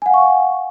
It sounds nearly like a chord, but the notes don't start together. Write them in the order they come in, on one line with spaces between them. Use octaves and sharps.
G#5 F#5 F5 C#6